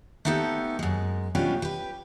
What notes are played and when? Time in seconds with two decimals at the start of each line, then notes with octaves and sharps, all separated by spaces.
0.25 A3 B3 D#4 G4 A4
0.79 F#2 G#3
1.35 B2 G3 C#4 D4 F4 G4
1.62 G4 B4